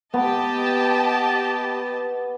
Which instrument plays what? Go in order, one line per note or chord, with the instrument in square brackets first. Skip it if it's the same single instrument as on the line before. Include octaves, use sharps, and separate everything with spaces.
[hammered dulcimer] B3 [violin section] G4 D#5 A5